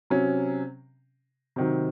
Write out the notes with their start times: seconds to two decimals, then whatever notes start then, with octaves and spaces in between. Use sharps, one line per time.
0.10 C3 F#3 C#4
1.56 C3 D#3 F#3